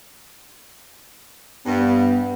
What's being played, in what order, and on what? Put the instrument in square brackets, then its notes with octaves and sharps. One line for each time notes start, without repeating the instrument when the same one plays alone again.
[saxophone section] G2 [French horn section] B3